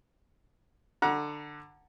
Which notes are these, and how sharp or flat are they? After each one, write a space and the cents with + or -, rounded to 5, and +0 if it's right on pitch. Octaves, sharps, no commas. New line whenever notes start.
D3 +15 F#5 +0 A#5 +40